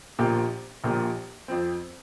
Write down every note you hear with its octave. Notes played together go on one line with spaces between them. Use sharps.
A#1 A#2 F3 A#3 G4
A#1 A#2 F3 A#3 G4
F2 F3 C4